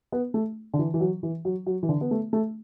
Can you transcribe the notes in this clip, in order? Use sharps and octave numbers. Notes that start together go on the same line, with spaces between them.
B3
A3
D3
E3
E3
F#3
E3
F#3
F#3
E3
D3
B3
A3
A3